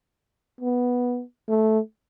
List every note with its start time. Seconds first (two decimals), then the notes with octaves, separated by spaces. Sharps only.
0.61 B3
1.49 A3